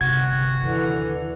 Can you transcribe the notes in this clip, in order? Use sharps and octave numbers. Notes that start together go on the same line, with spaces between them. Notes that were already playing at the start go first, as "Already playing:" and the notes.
G1 C3 F#4 F#5 G#6
D#2 D3 E3